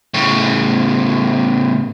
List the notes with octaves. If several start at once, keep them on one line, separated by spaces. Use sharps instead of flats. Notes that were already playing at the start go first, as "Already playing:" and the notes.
A2 C#3